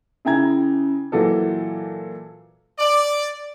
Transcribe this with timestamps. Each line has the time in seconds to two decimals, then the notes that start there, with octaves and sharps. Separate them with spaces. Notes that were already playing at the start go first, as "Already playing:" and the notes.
0.25 C#3 E4 G5 A#5 G#6
1.12 A#2 E3 F#3 A4
2.79 D5